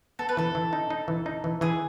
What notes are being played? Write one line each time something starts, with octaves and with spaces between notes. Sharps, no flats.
B3 A4
B4
E3 A4
E3
D#4
D#4
E3
D#4
E3
E3 G#4